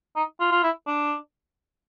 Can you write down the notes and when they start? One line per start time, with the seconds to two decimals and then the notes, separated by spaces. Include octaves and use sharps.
0.16 D#4
0.40 F4
0.52 F4
0.63 E4
0.87 D4